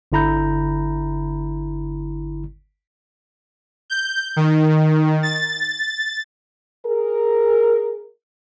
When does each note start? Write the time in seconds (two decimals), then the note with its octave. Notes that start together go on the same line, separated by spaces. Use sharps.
0.12 G1 D3 E4 A#5 B5 G6
3.90 G6
4.36 D#3
5.23 A6
6.86 G#4 A#4